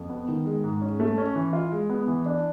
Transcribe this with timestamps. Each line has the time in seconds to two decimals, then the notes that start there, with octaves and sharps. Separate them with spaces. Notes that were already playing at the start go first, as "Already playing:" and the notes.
Already playing: F2
0.10 B3
0.28 D#3
0.46 G#3
0.64 G#2
0.82 C#4
0.99 A3
1.18 C#4
1.35 E3
1.53 F4
1.72 G#3
1.90 B3
2.07 E3
2.26 D4